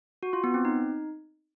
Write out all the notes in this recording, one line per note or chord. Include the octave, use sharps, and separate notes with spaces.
F#4
F4
B3
C4
D#4